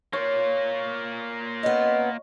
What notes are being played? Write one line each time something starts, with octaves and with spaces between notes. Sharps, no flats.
A#3 F4 C#5
B3 C#4 D#5